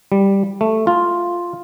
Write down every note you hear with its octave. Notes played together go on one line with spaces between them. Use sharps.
G3
A3
F4